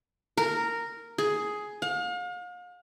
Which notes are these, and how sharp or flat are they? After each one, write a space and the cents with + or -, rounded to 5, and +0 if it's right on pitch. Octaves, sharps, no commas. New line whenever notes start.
A#4 -10
G#4 +10
F5 +40